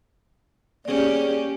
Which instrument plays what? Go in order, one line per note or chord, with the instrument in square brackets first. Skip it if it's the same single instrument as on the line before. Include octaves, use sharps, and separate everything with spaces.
[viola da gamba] A#3 C#4 G4 [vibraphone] G#4 D5